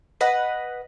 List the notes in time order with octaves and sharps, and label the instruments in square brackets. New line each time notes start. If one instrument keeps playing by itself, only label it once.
[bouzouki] B4 D#5 F#5